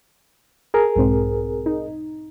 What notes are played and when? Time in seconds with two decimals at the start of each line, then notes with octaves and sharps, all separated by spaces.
0.74 G#4 A#4
0.96 B1 G#2 C4
1.66 D#4